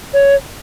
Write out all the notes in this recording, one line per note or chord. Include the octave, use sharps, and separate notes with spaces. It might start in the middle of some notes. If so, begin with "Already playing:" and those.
C#5